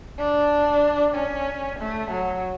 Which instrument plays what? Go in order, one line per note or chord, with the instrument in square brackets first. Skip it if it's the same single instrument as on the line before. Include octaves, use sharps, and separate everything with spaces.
[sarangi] D4
C#4
A3
F#3